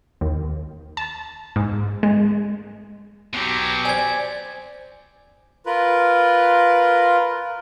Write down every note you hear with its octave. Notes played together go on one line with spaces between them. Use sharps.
D#2
A5
G#2
G#3
B2 F#3 G4
C5 D5 G#5 G#6
F4 A#4 B4